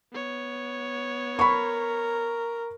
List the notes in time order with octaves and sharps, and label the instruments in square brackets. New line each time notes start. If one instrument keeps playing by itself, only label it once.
[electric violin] B3 C#5
[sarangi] A#4 [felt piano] B5 C#6